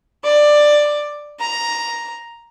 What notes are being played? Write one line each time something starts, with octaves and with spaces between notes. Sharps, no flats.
D5
A#5